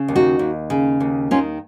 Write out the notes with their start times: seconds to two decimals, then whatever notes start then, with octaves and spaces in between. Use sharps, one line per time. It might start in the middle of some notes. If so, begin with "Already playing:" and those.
Already playing: C#3
0.08 D#2
0.16 D#4 F#4
0.39 D#2
0.70 C#3
1.00 D#2
1.31 D#3 C#4 F4